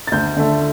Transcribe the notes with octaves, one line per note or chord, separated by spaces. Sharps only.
A6
D2 G6
D3 A3